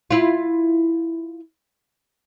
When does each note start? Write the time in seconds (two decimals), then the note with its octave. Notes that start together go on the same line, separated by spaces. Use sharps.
0.11 E4 F4